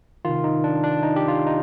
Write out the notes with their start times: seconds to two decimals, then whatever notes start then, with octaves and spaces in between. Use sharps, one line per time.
0.25 C3 D#3 F4
0.44 D#4
0.64 D4
0.84 D4
1.03 D#4
1.16 G4
1.28 F4
1.46 D#4